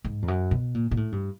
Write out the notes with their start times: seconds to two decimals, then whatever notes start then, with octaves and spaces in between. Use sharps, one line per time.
0.04 G#2
0.22 F2
0.28 F#2
0.51 B2
0.74 A#2
0.91 A#2
0.97 A2
1.12 G2